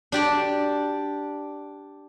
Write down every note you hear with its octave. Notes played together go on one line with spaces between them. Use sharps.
D4 G4 D5